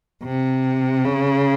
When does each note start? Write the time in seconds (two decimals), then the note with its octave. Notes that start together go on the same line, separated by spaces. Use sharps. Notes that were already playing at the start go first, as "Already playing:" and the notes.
0.24 C3
1.04 C#3